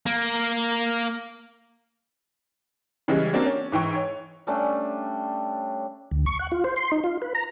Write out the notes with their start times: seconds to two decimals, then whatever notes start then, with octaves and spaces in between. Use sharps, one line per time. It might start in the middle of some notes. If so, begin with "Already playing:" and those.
0.06 A#3
3.08 C#3 E3 G3 G#3
3.33 A#3 C4 D4 F#4
3.46 C#4
3.72 G#2 E3 G5 C#6
3.95 C#5
4.47 G3 A3 C#4 D4
6.12 D2
6.26 C#6
6.39 F#5
6.52 F4
6.64 C5
6.76 C6
6.92 D#4
7.04 F4
7.22 B4
7.35 A#5